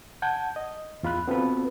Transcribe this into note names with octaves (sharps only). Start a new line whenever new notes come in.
F#5 A5 G6 G#6
D#5
E2 F4 B5 F#6
B3 C4 F4 F#4 A4 B4